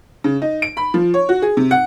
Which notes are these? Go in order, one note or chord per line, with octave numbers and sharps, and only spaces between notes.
C#3
D#4
D7
B5
F3
C#5
F#4
G#4
C3
F#5